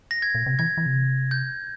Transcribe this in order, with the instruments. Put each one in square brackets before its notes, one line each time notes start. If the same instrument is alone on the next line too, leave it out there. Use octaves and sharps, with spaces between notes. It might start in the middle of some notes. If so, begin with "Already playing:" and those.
[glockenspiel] A#6
G#6
[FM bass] A#2
C3
[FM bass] E3 [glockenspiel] G#6
[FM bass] E3
C3
[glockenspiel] G6